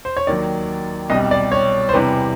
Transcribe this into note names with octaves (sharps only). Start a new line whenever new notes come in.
C5
C#5
D#2 D#3 F#3 D5
C2 B2 G3 D#5
D5
C#5
C5
E2 C3 E3 G3 B4